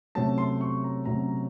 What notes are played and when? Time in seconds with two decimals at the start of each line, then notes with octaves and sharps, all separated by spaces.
0.15 C3 F#3 A3 C#4 A5
0.38 C6
0.61 C#6
0.84 A#5
1.06 C3 F#3 A3 C#4 A#5